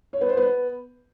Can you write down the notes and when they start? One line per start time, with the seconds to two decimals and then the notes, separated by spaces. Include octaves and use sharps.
0.13 C#5
0.21 B3
0.29 C5
0.37 B3